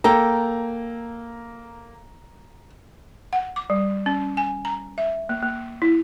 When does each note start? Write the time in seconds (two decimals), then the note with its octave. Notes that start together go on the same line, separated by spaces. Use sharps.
0.04 A#3 A4 G5 A#5
3.33 F#5
3.56 D6
3.70 G3
4.06 C#4
4.37 G#5
4.65 A#5
4.98 E5
5.29 A#3
5.42 A#3
5.82 E4